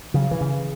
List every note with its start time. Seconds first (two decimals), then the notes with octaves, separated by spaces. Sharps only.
0.14 C#3 F#3
0.31 E3
0.41 C#3